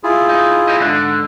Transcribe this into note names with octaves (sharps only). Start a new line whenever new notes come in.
E4 F4 G#4
D#4
C4 G4 D#5
G#2 D3 D4